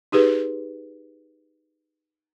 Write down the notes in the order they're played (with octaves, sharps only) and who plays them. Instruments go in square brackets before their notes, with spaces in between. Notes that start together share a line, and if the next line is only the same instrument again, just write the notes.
[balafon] D#4 G4 G#4 B4